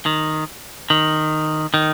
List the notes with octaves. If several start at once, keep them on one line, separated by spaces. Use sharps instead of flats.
D#3
D#3
D#3